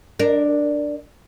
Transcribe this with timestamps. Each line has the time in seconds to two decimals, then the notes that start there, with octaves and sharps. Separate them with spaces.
0.19 D4 A#4